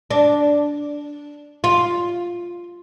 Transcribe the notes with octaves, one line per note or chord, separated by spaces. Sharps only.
D4
F4